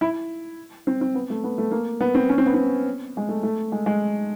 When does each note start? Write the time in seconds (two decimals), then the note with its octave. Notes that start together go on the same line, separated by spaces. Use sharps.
0.01 E4
0.87 C4
1.01 C4
1.15 B3
1.30 A3
1.44 B3
1.58 A3
1.72 A#3
2.01 B3
2.15 C4
2.29 C#4
2.38 C4
2.46 B3
2.54 C4
3.17 G#3
3.29 A3
3.43 A3
3.72 G#3
3.86 G#3